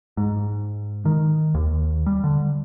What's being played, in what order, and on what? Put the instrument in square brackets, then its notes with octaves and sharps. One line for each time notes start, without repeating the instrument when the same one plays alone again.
[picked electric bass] G#2
D#3
D#2
G3
D3